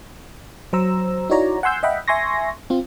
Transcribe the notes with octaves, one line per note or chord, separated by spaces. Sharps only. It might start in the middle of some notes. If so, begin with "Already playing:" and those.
F#3 C5 A#5 E6
D#4 E4 F#4 C#5 D5 A#5
F#5 G#5 C6 E6 G6
D#5 E5 F#5 G5 B5
E5 G#5 C6 C#6 A#6
C4 F4